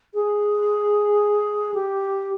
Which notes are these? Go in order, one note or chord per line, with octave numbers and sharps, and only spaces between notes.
G#4
G4